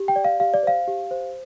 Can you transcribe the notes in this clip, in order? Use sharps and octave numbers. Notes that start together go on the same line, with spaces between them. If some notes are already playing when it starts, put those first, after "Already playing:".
Already playing: G4
G5
D5
F5
G4 F5
D5
C5 F5
G4
C5